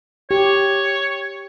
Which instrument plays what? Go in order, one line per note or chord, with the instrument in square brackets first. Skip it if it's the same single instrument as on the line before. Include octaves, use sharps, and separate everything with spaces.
[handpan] G4 [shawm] C#5